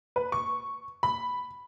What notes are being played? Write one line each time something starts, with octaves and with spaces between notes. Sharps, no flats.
B4
C#6
B5